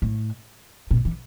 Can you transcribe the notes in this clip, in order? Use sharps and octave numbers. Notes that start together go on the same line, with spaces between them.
A2
A#2
E3